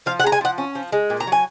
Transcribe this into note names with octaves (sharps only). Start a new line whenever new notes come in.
F3 F5
F#5
G#3 A#5
G#5
F3 F#5
C#4
F3
G#3
A#2
A#5
F#3 G#5